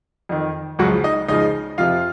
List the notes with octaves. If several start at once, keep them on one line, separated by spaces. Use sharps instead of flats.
F2 D#3
C#2 C#3 F3 F#3 F#4
D#4 D#5
C#2 C#3 F3 D#4 D#5
F2 C3 F3 F4 F5